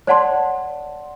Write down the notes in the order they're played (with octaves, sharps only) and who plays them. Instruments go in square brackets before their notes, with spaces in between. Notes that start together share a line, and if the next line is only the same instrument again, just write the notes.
[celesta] C#5 D5 F#5 A5 C6